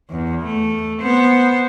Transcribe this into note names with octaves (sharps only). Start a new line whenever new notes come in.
E2
A3
B3 C5